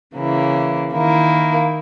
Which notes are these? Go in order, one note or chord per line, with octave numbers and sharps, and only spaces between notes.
C#3 E3 A#3 E4
D#3 A#3 E4